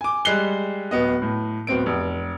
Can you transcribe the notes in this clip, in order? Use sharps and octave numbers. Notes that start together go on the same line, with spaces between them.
G#5 D6
G3 G#3 F#6 C7 G7
D1 B3 D#5
A2
D1 B3 C4 D7
F1